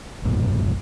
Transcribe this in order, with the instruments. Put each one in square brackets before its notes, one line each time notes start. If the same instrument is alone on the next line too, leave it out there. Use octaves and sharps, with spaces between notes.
[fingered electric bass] F1 B1 G2 A#2